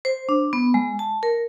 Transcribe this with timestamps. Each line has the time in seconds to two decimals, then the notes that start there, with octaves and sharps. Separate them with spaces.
0.05 C5
0.29 D4
0.53 B3
0.74 G#3
0.99 A5
1.23 A#4